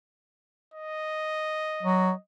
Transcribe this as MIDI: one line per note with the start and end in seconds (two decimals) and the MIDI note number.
0.74 2.20 75
1.83 2.12 54